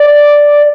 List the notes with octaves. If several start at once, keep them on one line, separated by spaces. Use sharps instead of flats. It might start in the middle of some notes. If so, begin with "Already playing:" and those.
Already playing: D5